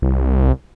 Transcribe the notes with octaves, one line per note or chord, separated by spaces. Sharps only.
C2